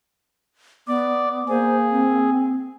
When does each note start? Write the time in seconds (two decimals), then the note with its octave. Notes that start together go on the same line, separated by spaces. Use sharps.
0.88 B3 D5
1.48 A#3 G#4 C5
1.91 C4